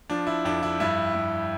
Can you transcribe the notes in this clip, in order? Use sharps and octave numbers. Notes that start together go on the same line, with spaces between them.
F3 D4
E4
F2 D4
E4
G2 E4
G2